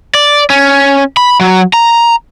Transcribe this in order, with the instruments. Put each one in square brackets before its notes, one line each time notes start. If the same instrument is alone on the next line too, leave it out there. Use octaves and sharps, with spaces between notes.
[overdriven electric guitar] D5
C#4
B5
F#3
A#5